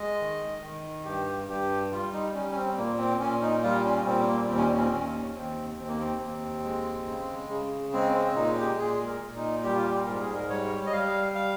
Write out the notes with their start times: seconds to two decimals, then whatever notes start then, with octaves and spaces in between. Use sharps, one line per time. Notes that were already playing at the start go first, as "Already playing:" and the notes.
Already playing: G#3 D#5
0.21 D#3
0.63 D#3
1.05 G2 G4
1.48 G2 G4
1.91 G3 F4
2.13 D#4
2.34 G3 C#4
2.51 C#4
2.56 C4
2.78 A#2 A#3
2.98 C4
3.20 A#2 C#4
3.42 D#4
3.63 G3 F4
3.85 C#4
4.06 A#2 C4
4.27 A#3
4.49 D#2 C4
4.57 C#4
4.65 C4
4.72 C#4
4.79 C4
4.92 D#2 C#4
5.35 D#2 C4
5.78 D#2 C4
5.88 A#3
5.99 C4
6.20 D#2
6.64 G#3
7.06 C#3
7.49 C#3
7.93 G#3 C4
8.14 C4
8.35 A#2 D#4
8.57 G4
8.78 A#2 G#4
9.07 A#4
9.21 A#2
9.36 D#4
9.64 G3 G4
9.75 F4
9.84 G4
10.07 G#2 A#4
10.21 G#4
10.34 A#4
10.50 G3 C#5
10.86 D#5
10.92 G3 F5
11.35 F5